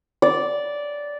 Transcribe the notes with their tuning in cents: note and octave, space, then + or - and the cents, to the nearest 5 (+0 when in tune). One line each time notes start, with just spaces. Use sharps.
D5 -10